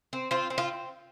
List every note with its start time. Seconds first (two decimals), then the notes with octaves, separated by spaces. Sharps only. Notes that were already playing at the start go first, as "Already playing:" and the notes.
0.13 C4
0.31 C4 F4
0.50 C4
0.58 F4